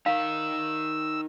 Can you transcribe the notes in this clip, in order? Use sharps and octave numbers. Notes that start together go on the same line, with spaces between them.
D#4 A#4 F5 E6